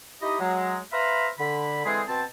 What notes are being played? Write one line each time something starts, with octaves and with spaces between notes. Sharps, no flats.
D#4 E4 G4 D#5
F#3 G#3
B4 C5 E5 F5 A#5 B5
D3 B5
D3 E3 G#3 C4 G#4
B2 C4 A5